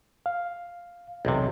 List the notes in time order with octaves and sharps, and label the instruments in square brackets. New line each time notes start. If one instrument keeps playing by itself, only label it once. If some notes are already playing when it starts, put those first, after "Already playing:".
[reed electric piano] F5
[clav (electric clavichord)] B1 E2 C3